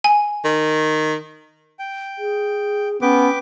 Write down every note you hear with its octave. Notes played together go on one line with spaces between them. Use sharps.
G#5
D#3
G5
G#4
B3 C#4 B4 G5 D6